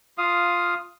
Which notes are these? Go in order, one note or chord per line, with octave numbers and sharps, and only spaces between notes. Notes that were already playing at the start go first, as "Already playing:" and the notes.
F4 F5 D#6